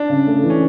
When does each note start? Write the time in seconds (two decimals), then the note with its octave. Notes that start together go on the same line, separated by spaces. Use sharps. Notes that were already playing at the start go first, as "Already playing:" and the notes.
Already playing: D4
0.10 C#3
0.27 A3
0.44 E3
0.50 C#4